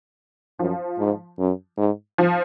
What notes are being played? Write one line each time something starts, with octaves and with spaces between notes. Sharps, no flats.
F#2 F3
G#2
F#2
G#2
F3